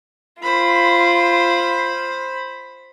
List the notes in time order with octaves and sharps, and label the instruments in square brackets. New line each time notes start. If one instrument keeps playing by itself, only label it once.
[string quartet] F4 [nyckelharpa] C5 B5